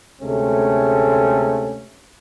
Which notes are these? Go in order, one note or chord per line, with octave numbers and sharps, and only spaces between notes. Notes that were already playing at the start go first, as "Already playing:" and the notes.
D2 C3 G#3 A3 C#4